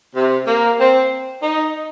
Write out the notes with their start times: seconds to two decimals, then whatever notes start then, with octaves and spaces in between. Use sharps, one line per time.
0.15 C3
0.46 A#3
0.79 C4
1.42 D#4